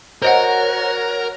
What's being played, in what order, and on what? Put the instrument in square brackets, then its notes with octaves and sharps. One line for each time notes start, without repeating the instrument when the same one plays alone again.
[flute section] F#4 C#5 [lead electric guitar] A#4 [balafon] C5 D#5 F#5